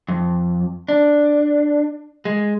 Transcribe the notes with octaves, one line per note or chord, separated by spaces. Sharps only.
F2
D4
G#3